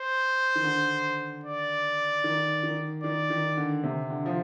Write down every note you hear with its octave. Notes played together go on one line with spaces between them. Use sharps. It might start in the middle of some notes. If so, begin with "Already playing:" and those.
Already playing: C5
D#3
D3
D5
D#3
D#3
D#3 D5
D#3
D3
C3
D3
F3